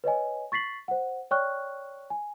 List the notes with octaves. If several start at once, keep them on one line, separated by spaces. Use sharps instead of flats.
B4 C#5 D#5 G#5
C#6 A6 B6 C7 F#7
C5 F#5
C#5 D5 G5 C#6 F6 F#6
G#5